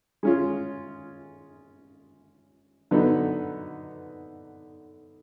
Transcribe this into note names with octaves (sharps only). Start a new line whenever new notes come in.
G#3 C#4 F4
D3 F#3 B3 D#4